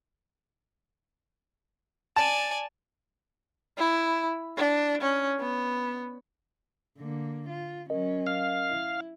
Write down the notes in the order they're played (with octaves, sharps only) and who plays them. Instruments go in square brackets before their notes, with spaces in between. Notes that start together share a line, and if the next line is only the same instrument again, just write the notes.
[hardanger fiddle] D5 G#5 [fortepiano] A5
[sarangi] E4
D4
C#4
B3
[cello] D3 A#3
F4
[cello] F#3 C#4 [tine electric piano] A#4 D#5
[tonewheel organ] F5
[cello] E4